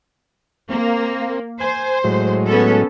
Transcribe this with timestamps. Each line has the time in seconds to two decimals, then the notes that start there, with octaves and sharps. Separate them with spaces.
0.70 A#3 C4
1.61 C5 G#5
2.04 A2 F#3 G#3
2.47 B3 C#4 A4